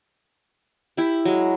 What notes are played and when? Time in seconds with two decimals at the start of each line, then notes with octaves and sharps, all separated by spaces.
0.97 E4 G4
1.25 F#3 G#3